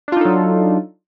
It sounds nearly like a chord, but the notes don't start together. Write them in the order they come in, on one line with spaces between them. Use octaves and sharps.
D4 F4 D#4 A4 F#3